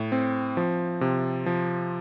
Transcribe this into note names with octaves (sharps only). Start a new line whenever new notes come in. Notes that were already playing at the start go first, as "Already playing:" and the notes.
Already playing: A2
C4
F3
C3
F3